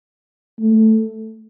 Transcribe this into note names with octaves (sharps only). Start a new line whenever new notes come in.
A3